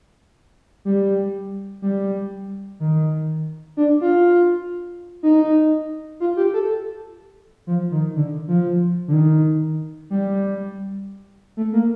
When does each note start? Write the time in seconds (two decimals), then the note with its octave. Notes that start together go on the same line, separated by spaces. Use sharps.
0.85 G3
1.82 G3
2.80 D#3
3.77 D4
4.01 F4
5.23 D#4
6.20 F4
6.37 G4
6.54 A4
7.67 F3
7.91 D#3
8.16 D3
8.48 F3
9.08 D3
9.13 D#3
10.10 G3
11.57 A3
11.73 A#3